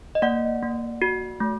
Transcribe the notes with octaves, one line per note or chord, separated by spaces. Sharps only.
D#5
A#3 D5 F#5
A#3
F#4
A3